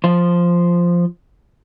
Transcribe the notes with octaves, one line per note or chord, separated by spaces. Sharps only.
F3 C5